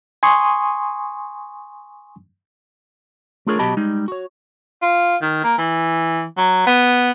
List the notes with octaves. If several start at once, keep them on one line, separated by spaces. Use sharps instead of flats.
G#5 C6 C#6 D#6
A3 D4 F4 G#4 A#4 C#5
B2 F#3 G4 D#5 A5 B5
G3 G#3 D#4
F#4 C#5
F4
D#3
A#3
E3
F#3
B3